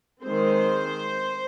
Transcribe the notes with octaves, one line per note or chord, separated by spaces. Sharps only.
D#3 G#3 C4 C5